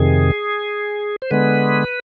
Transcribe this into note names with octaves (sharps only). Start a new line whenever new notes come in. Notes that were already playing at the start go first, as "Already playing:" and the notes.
Already playing: F2 C3 D#3 G#4
C5
D3 G#3 B3 B4